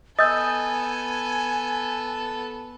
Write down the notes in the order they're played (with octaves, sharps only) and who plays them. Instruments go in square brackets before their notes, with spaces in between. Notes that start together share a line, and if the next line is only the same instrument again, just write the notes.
[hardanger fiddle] B3 A4 [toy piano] D#5 [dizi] G#5 [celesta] D#6 E6 G6